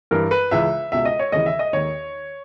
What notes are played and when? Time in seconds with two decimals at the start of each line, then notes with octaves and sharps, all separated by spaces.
0.11 G2 E3 A#4
0.31 B4
0.51 C#2 C#3 E3 E5
0.92 C#2 B2 E5
1.05 D#5
1.19 C#5
1.32 D#2 C#3 E3 D#5
1.46 E5
1.59 D#5
1.73 D#2 D#3 C#5